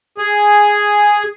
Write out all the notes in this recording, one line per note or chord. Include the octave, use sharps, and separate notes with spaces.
G#4